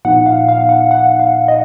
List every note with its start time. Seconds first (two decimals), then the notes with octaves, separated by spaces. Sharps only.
0.05 A#2 F3 B3 D#4 F#5
0.26 F5
0.48 F5
0.69 F#5
0.91 F#5
1.20 F5
1.48 D#5